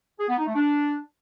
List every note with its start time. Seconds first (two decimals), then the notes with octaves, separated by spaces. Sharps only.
0.20 G#4
0.28 B3
0.37 D#4
0.46 A3
0.55 D4